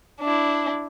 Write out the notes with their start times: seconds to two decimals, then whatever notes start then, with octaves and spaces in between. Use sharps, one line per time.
0.21 D4 E4